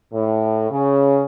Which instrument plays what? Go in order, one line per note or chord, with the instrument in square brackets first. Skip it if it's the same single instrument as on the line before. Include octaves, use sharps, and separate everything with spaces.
[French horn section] A2
C#3